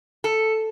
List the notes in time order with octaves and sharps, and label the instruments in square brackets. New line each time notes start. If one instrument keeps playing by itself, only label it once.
[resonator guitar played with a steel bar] A4